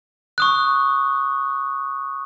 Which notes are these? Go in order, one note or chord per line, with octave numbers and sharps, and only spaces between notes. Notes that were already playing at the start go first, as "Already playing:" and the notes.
C#6 D#6 F#6